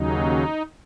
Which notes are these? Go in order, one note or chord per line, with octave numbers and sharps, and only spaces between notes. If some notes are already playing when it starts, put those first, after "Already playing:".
Already playing: D#2 C#3 F#3 D#4